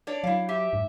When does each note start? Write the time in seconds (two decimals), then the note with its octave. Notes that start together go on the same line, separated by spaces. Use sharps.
0.07 D4 C#5 D5
0.24 F#3 E4 F5
0.49 G4 E5
0.73 G#2